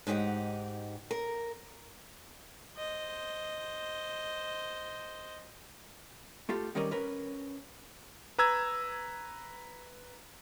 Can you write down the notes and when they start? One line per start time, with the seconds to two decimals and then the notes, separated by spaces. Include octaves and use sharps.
0.07 G#2 D#4 G4 C5 F#5
1.11 A#4
2.77 C5 D#5
6.49 A3 F4 G4 A4
6.75 D#3 G3 C#4 A#4 D5 D#5
6.91 C#4 A#4 B4
8.38 B4 A#5 E6 G#6